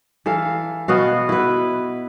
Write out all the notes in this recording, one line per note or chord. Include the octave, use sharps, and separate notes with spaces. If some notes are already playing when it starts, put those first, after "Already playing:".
E3 A4 F5
B2 B3 F#4 F5
E4 B4